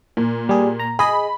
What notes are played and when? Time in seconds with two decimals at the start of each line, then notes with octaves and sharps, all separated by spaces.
0.17 A#2
0.49 G3 G#4
0.79 A#5
0.99 G#4 D#5 B5